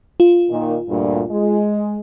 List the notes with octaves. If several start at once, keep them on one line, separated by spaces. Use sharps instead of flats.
F4
A#2 D#3
D2 G2 A#2
G#3